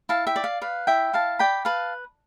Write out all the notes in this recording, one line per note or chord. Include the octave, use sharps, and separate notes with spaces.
E4 F5 A5
E5 G5
D5
F5
B4 F5
E4 E5 G5
E4 F5 A5
D5 G5 B5
B4 F5 A5